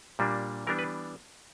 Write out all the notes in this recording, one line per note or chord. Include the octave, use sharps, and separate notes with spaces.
A#2 G3 A#3 D4
E3 G3 B3 D4 A#4
B4